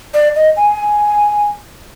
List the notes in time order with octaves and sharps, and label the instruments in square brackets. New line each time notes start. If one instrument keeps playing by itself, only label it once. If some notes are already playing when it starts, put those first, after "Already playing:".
[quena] D5
D#5
G#5